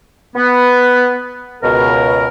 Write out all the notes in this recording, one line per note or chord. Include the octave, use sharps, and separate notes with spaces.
B3
C#2 B2 A#4